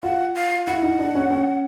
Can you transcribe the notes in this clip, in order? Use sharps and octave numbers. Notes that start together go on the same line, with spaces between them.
F4 F#5
F5
E4 F#5
D#4
D4
C#4
C#4